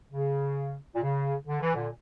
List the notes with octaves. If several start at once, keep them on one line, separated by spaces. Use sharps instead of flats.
C#3
A#2
C#3
D3
E3
A#2 D3